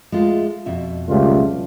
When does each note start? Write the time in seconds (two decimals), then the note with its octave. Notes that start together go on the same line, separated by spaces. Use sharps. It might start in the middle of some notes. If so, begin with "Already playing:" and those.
0.12 G#3 A3 F4
0.66 F2 B2 E5
1.09 C#2 G3 A3 F4